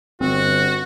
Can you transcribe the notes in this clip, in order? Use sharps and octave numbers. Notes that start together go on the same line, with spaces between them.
G1 C4 F#4